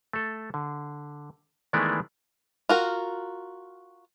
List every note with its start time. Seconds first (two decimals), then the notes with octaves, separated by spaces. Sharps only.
0.13 A3 A4
0.54 D3
1.73 D#3 E3 G#3 A3 B3 D5
2.69 F4 F#4 A#4